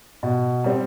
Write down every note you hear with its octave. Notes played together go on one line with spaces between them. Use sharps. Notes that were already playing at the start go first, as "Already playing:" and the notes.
B2
G3 C4